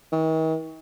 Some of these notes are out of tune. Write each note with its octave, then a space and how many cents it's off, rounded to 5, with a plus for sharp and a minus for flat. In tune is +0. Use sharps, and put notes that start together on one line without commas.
D#3 +45